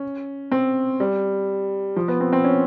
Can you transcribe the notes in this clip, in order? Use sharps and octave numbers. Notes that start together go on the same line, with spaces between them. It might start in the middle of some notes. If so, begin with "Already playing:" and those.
Already playing: C#4
C4
G3
F3
B3
C4
C4
C#4